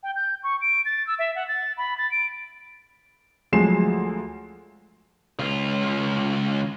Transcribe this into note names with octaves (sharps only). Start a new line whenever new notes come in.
G5
G6
C#6
D7
A6
E6
E5
F#5
A6
B5
A6
D7
D2 F3 F#3 G#3 C7 E7
C#2 F4